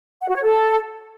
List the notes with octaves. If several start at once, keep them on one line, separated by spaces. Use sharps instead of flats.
F#5
F#4
C#5
A4